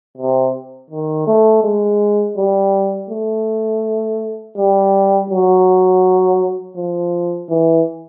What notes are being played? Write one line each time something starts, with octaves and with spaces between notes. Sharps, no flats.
C3
D#3
A3
G#3
G3
A3
G3
F#3
F3
E3